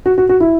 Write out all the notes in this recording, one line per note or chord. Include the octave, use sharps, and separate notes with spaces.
F#4
F#4
F#4
E4